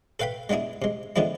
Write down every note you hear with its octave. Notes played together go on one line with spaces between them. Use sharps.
A4 B4 F5 G5 B5
G#3 B3 D4 E4 G#4
C3 G#3
D3 D#3 F3 G#3 B3 E4